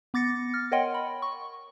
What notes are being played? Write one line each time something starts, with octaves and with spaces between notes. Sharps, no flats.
B3 D6 A6 A#6 C#7
F6
A#4 C#5 D#5 F#5 G5 C6
B5
C#6